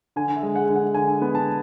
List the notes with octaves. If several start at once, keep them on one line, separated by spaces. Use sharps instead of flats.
D3 G#5
E5
G#3
F#5
D3
F#5
D3 G#5
B3
A5